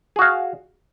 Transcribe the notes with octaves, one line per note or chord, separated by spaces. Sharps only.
F#4 G#4 F5